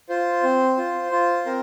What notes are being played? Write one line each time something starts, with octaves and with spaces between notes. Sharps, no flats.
F4 C5
C4
F4
F4
C4 A#4